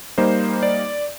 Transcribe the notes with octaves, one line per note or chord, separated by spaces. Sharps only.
G3 A#3 D#4 C5
D5